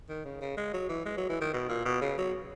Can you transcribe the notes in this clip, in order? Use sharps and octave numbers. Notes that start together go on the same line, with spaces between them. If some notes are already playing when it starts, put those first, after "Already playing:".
D#3
C#3
C#3
G#3
F#3
E3
G#3
F#3
E3
D#3
B2
A#2
B2
C#3
F#3